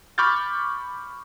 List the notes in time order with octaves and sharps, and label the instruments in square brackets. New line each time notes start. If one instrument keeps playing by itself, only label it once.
[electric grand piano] B5 C#6 D6 F6 G6 A6